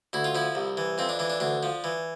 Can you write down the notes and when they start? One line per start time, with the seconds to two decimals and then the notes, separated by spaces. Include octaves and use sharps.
0.13 D2 E4
0.24 F4
0.35 F3 E4
0.55 C2
0.77 E3
0.98 F2 C4
1.09 D4
1.19 E3 D4
1.30 D4
1.40 D2 D4
1.63 F3
1.84 E3